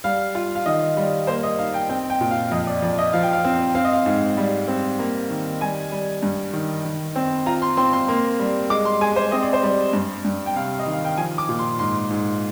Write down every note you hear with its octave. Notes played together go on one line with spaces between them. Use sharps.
G3 F5
F4
F5
D#3 D#5
G3
A#3 C5
D#5
D#4 F5
G5
C4 G5
G5
A#2
F5
F2 D#5
D5
F2 D5
D#5
F3 F5
G5
F5
C4
C4 F5
D#5
F5
G#2
G3
C4
A#3
D#3
G3 G#5
G3
G2
D#3
D#3
C4
F4 A#5
C6
C4 C6
C6
A#3
G3
G#3 D6
C6
G#3 G#5
C5
C4 D#5
D5
C5
G3 D5
G2
G2
G5
C3 F5
D#5
D#3
F5
G5
F3 G#5
D6
A#2
C6
G#2 C6
G#2